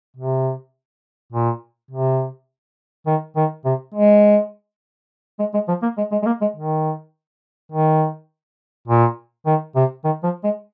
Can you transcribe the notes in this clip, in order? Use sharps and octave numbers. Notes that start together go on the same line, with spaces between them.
C3
A#2
C3
D#3
D#3
C3
G#3
G#3
G#3
F3
A#3
G#3
G#3
G#3
A#3
G#3
D#3
D#3
A#2
D#3
C3
D#3
F3
G#3